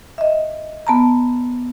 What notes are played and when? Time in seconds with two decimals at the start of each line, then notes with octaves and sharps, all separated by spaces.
0.18 D#5 E5
0.87 B3 A5 A#5